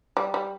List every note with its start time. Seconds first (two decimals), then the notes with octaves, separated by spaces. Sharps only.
0.17 G3
0.34 G3